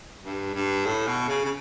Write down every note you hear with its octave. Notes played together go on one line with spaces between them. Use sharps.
G2
G2
A2
B2
C#3
C#3